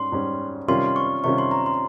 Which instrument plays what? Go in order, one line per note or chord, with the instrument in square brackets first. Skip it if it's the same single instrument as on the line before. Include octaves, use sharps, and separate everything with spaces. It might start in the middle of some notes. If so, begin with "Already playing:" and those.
Already playing: [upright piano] G#2 G3 C#4 [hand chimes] C6
[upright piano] G#2 G3 C#4
[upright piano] C3 D#3 G3 C#4 F4 [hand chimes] C6
[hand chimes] C#6
[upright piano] C3 D#3 G3 C#4 F4 [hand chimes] C#6
[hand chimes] C6
A#5
C6